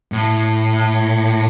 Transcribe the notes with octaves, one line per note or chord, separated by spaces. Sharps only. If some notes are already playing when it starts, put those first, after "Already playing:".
A2